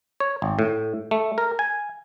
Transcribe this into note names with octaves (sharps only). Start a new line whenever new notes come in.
C#5
G#1
A2
A3
A#4
G#5